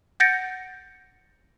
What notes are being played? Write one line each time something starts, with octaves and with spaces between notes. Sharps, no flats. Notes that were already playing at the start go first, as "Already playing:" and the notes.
F#5 G6 A6 A#6 C#7 D7